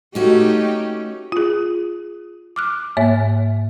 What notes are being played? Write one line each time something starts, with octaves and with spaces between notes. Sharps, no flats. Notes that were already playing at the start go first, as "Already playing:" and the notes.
A3 C#4 D#4 F#4 G4
F4 G#4
D6 F6 F#6
G#2 A#3 C#5 E5